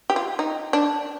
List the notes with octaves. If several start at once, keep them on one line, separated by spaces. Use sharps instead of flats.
G4
F4
D#4
D4